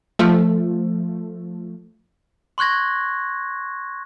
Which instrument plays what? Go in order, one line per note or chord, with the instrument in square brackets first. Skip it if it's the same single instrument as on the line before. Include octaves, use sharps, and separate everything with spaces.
[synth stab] F3 A3
[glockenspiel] C6 C#6 F#6 G#6 A#6